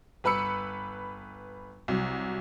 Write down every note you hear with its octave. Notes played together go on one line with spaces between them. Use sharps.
G1 B4 B5 E6 C#7
C2 F#3